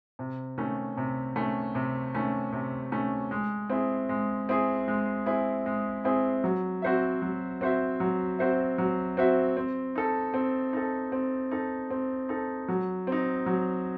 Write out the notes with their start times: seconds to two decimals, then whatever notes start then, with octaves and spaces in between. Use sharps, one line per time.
0.19 C3
0.58 D#3 A3 C#4
0.97 C3
1.36 D#3 A3 C#4
1.75 C3
2.15 D#3 A3 C#4
2.53 C3
2.91 D#3 A3 C#4
3.31 G#3
3.70 C4 E4 G#4
4.09 G#3
4.49 C4 E4 G#4
4.88 G#3
5.26 C4 E4 G#4
5.66 G#3
6.04 C4 E4 G#4
6.44 F#3
6.82 C4 F#4 C5 E5
7.22 F#3
7.61 C4 F#4 C5 E5
8.00 F#3
8.39 C4 F#4 C5 E5
8.78 F#3
9.17 C4 F#4 C5 E5
9.57 C4
9.95 D#4 A4
10.34 C4
10.73 D#4 A4
11.12 C4
11.51 D#4 A4
11.91 C4
12.29 D#4 A4
12.68 F#3
13.07 C4 D#4
13.46 F#3